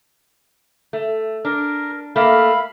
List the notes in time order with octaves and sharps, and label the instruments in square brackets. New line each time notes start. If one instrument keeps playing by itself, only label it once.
[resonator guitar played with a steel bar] A3
[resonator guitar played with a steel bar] D4 [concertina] A#4
[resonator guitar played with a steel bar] A3 A#3 [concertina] F5 B5